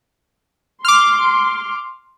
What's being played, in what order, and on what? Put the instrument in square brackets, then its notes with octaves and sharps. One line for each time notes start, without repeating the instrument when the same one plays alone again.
[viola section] C6 [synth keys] D6 F6